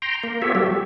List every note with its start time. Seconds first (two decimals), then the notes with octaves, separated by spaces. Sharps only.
0.02 G5 A#5 C6
0.23 A#3
0.42 B3 F4 G4 A4 C#5 E5
0.55 F#3 G3 F#4 G4 A4
0.67 G4